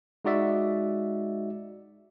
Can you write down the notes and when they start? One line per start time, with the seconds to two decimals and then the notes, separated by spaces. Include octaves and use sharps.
0.25 G#3 D#4 F#4 D5 E5